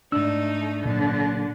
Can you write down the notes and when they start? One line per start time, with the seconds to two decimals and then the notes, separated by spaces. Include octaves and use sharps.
0.12 G#2 A3 D4 D#4 E6
0.85 A#2 D3 F#3